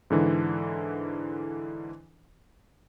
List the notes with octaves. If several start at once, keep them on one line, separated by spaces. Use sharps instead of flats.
G#2 D3 E3